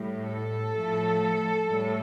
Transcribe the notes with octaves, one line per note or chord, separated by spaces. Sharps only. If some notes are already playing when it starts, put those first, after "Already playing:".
Already playing: A2 G3
A4
A2 F3 A3
A2 G3